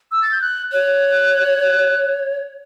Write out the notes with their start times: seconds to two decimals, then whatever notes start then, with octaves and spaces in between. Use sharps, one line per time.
0.12 E6
0.22 A6
0.32 G6
0.41 F#6
0.72 C#5 F#6